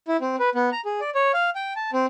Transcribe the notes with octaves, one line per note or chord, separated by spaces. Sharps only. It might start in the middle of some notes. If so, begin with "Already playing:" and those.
E4
C4
B4
B3
A#5
G#4
D5
C#5
F5
G5
A5
C4